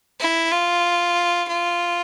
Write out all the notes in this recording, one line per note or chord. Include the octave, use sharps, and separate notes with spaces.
E4
F4
F4